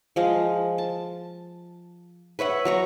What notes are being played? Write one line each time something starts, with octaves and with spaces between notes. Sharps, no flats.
F3 G#3 F5
A5
B4 C#5 E5 F#5
F#3 A#5 C#6